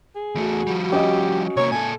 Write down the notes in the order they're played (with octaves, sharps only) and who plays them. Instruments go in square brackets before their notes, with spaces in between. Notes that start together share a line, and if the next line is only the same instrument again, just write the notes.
[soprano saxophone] G#4
[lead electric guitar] E2 A3 [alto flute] F#4
[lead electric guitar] F3 G3
[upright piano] C#4 D#5 [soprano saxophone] G4
[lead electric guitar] C3 A#3 [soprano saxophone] C#5
[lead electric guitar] A#2 A4 [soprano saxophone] G#5